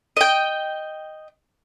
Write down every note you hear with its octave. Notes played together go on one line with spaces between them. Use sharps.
D#5 G5